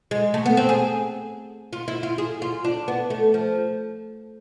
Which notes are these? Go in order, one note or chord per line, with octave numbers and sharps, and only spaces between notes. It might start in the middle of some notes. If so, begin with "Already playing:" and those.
G#3
A3
B3
C4
G#4
F4
E4
F4
G#4
F4
D4
B3
A3
F3